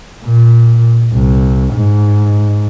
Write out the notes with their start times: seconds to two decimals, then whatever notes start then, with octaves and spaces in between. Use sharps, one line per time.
0.24 A#2
1.13 C2
1.73 G#2